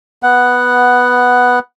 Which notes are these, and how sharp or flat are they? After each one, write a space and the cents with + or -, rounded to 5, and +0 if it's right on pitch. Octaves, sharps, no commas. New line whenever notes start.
B3 +0 F#5 +5